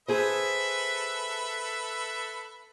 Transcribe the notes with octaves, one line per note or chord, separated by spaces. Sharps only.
G#4 A4 B4 C5 E5